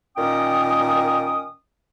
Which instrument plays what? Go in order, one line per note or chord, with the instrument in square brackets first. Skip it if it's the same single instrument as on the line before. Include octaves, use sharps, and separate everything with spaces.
[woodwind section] A#2 D#3 C#4 G5 D#6